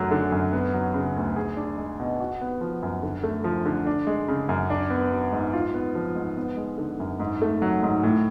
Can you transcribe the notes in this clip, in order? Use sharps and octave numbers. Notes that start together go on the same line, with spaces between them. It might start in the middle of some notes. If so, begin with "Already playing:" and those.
Already playing: F#2 F#3 A3
D3
F#2
B3
F#3
C#3
D2
G#4
D4
G#3
B2
F#4
B3
F3
F#2
D3
A3
F3
D3
D4
G#3
C#3
F#2
D4
B3
F#3
G#2
F4
B3
F3
G#2
B3
G#3
D3
F#2
G#2
A3
F#3
G#2
A2